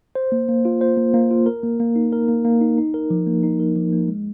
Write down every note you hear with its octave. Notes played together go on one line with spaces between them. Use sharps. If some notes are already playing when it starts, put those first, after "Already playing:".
C5
A#3
A#3
F4
C5
A#3
A#3
F4
A#4
A#3
A#3
D#4
A#4
A#3
A#3
D#4
D#4
A#4
F3
A#3
D#4
A#4
F3
A#3
G#3